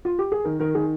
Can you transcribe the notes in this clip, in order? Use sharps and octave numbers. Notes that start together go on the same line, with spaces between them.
F4
G4
G#4
D#3 A#4
D#3 A#4
D#3 G#4